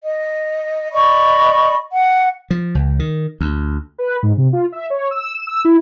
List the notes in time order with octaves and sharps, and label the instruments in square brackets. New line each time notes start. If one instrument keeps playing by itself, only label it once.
[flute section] D#5
D5 D#5 B5 C#6
F#5
[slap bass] F3
C#2
D#3
D2
[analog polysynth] B4
G#2
C3
F4
E5
C#5
E6
E7
E6
E4